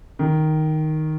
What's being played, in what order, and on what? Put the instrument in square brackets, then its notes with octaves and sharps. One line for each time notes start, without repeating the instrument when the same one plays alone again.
[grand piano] D#3